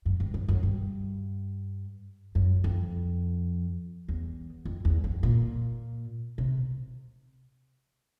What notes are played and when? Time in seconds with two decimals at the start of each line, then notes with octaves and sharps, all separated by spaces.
0.06 F#2
0.20 G2
0.34 F#2
0.48 F#2
0.63 G2
2.35 F#2
2.64 F2
4.08 E2
4.65 F2
4.85 E2
5.04 F2
5.23 A#2
6.38 C3